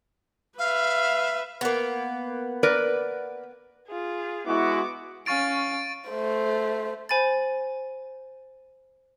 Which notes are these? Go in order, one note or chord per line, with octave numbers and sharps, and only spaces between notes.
B4 E5 F5
A#3 B3
A#4 B4 D5
F4 G#4
G#3 B3 E4 F#4 D6
C#4 F5 C#6 A6 D7
A3 C5
C5 G#5 B5 A6